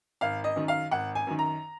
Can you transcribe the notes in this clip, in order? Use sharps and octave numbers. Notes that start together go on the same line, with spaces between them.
G#1 F5
D#5
F#2 D#3
F5
G#1 F#5
G#5
F#2 D#3
A#5